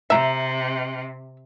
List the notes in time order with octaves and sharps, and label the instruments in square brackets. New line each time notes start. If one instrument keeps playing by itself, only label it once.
[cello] C3 [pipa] E5 A#5